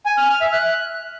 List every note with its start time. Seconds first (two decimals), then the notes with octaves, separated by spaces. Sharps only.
0.06 G#5
0.17 F6
0.29 F6
0.41 E5
0.53 F#6